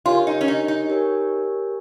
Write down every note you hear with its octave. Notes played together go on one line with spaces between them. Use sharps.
F4 G4 A#4 C#5 G#5
D#4
C#4
D#4
D#4
G4 A#4 C#5 G#5